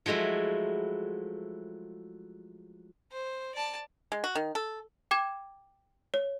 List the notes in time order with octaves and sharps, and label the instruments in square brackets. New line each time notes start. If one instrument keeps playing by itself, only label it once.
[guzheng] F3 F#3 G#3 A3 E4
[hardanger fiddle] C5
D5 A5
[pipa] G#3
F#4
D#3
A4
[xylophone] G5 D6 G#6 E7
C#5